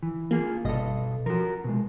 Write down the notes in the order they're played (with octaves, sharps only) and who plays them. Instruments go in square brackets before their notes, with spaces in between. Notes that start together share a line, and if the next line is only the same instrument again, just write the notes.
[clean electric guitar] E3
[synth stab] A#3 [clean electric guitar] F4 G#4
[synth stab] G1 G2 D#5 [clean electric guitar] B2 A4
[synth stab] F3 [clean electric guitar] F#4 A#4
[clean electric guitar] B2 G#3